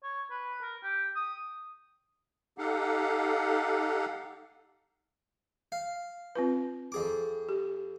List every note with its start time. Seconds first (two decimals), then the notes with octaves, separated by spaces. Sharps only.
0.03 C#5
0.30 B4
0.62 A#4
0.83 G4
1.15 D#6
2.58 D#4 G4 A4 F5 F#5
5.72 F5
6.35 C4 F4 B4
6.92 F2 G#4 D6
7.49 G4